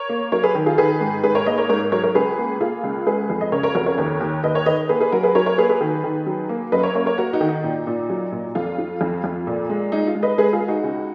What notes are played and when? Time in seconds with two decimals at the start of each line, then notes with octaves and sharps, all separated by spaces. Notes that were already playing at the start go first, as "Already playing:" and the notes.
Already playing: A#4 C#5
0.09 A#3
0.32 F#3 A#4 C#5
0.43 G#4 B4
0.55 D#3
0.66 F4 G#4
0.78 D#3 G#4 B4
1.01 G#2
1.23 G#2 G#4 B4
1.35 A#4 C#5
1.46 A#3 B4 D#5
1.58 A#4 C#5
1.69 G#2 A#4 C#5
1.92 F#3 A#4 C#5
2.03 A#4 C#5
2.15 C#2 G#4 B4
2.38 A#3
2.61 A#3 F4 G#4
2.83 C#2
3.06 G#3 G#4 B4
3.30 F2
3.41 D#5
3.52 C#3 A#4 C#5
3.63 A#4 C#5
3.75 F2 F#4 A#4
3.86 A#4 C#5
3.98 D#2 A#4 C#5
4.20 D#2
4.44 D#2 B4 D#5
4.55 A#4 C#5
4.66 D#3 B4 D#5
4.89 A#3 G#4 B4
5.00 G#4 B4
5.12 F#3 F#4 A#4
5.23 G#4 B4
5.35 F#3 A#4 C#5
5.46 A#4 C#5
5.58 A#3 G#4 B4
5.69 G#4 B4
5.81 D#3
6.04 D#3
6.26 F#3
6.49 A#3
6.72 F#2 B4 D#5
6.83 A#4 C#5
6.95 A#3 A#4 C#5
7.06 A#4 C#5
7.18 A#3 F#4 A#4
7.33 D#4 F#4
7.41 D#3
7.48 D#4
7.64 A#2
7.87 A#2
8.10 F#3
8.32 A#2
8.55 F2 F4
8.78 F3
9.01 F2
9.24 F2
9.47 A#2
9.69 G#3
9.92 G#3 D#4
10.07 F4
10.15 G#3
10.23 B4 D#5
10.38 G#3 G#4 B4
10.53 F4 G#4
10.60 G#3
10.68 D#4 F#4
10.83 C#2